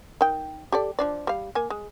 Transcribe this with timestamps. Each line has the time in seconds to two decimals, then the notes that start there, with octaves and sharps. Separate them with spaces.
0.21 D#3 G5
0.72 G4 A4 D5
0.99 F3 D4 D5
1.27 G3 F5
1.55 A#3 G#5
1.70 G#3